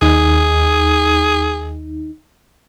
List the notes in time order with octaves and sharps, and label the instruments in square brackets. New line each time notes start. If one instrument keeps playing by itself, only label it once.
[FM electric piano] D#2 D#4 [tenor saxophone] G#4